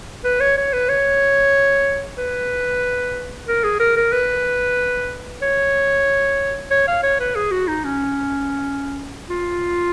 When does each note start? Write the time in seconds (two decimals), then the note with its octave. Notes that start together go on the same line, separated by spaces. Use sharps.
0.24 B4
0.40 C#5
0.57 C#5
0.73 B4
0.89 C#5
2.18 B4
3.48 A#4
3.64 G#4
3.80 A#4
3.97 A#4
4.12 B4
5.42 C#5
6.71 C#5
6.87 F5
7.03 C#5
7.20 B4
7.35 G#4
7.51 F#4
7.68 D#4
7.84 C#4
9.30 F4